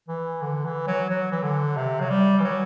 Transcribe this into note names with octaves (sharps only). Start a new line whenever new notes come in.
E3
D3
E3
F#3
F#3
E3
D3
C3
F#3
G3
E3
F#3